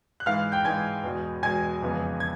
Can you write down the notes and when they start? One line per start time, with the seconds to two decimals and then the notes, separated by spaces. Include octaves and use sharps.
0.20 F#6
0.26 G#2 E3 G#3 F5 F6
0.52 G5 G6
0.65 G#2 E3 G#3 G#5 G#6
1.04 E2 B2 G#3
1.43 E2 B2 G#3 G#5 G#6
1.82 F2 C#3 E3 G#3 B3
2.20 G#6